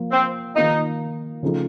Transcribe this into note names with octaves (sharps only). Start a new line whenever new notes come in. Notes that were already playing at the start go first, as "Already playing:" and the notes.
Already playing: F3 A#3 F4
C4
D#3 A#3 D#4 F4
C#3 F3 A3 D#4